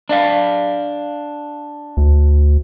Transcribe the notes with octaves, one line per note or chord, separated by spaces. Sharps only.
D4 D5 F5
D2